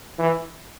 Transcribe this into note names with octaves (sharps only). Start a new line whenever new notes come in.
E3